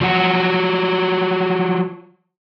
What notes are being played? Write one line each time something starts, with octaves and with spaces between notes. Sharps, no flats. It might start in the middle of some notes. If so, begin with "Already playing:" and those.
F3 F#3 F#4